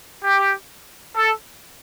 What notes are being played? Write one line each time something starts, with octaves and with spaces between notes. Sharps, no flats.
G4
A4